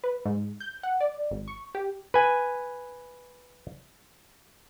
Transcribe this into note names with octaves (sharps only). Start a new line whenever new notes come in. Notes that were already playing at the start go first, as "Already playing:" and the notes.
B4
G#2
G6
F#5
D5
G#1
C#6
G4
B4 G#5